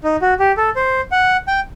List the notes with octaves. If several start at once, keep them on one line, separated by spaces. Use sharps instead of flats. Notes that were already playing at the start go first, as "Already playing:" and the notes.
D#4
F#4
G4
A4
C5
F#5
G5